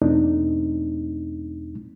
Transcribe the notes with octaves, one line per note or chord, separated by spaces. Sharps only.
E2 B2 A3 C4 D4 D#4